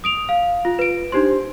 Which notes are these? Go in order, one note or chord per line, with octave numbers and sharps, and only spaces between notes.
D#6 D7 F7
F5
F4
B4 D7
D4 D#4 G4 C5 C6